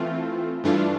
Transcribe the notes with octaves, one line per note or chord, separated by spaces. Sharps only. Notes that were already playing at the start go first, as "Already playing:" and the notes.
Already playing: E3 A3 C4 F4
G2 E3 A3 D4 F4